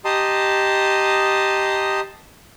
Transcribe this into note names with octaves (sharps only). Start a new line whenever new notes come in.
G4 D#5 A5 A#5 C6 D#6